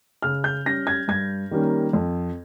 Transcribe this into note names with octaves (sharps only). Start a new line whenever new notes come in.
C#3 F6
G6
G3 C#4 A#6
G#6
G2 G#6
D#3 G3 A#3 C#4
F2